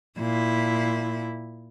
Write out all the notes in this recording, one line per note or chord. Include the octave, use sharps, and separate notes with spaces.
A#2 E4